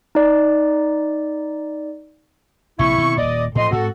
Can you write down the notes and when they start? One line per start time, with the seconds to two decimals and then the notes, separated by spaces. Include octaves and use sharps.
0.15 D#4 D5
2.79 A#1 C3 A#3 E4 C#6
2.98 B2 D#3 C4
3.17 D#1 A#2 D5 D#5
3.55 F2 A2 F3 D#5 C6
3.71 G#2 C4 F#4 A4